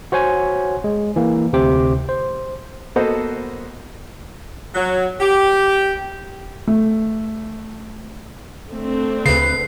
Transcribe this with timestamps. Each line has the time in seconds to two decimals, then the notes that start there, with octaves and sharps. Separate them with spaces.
0.12 F#4 C5 C#5 F#5 G#5
0.84 G#3
1.16 E3 A#3
1.53 D2 C3 G4 C5 D6
2.09 C5
2.96 A#3 B3 F#4 A4 C5 D#5
4.75 F#3
5.20 G4
6.67 A3
8.71 A3 C4 D4
9.26 D2 C#3 B4 C7